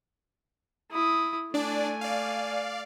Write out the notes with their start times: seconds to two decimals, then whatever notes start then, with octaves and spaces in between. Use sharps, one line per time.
0.92 E4 D#6
1.54 A3 D4 D5 G#5
2.01 D5 F5